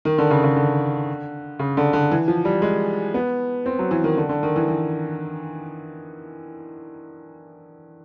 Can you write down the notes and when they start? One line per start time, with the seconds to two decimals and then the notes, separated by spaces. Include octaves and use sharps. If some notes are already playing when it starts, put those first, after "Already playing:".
0.05 D#3
0.18 D3
0.30 C#3
0.44 C#3
0.56 D3
1.59 C#3
1.77 D3
1.93 D3
2.11 E3
2.28 F3
2.45 G3
2.62 G#3
3.14 B3
3.66 C4
3.79 F#3
3.91 E3
4.04 D#3
4.17 D3
4.29 D3
4.43 D#3
4.56 E3
4.68 E3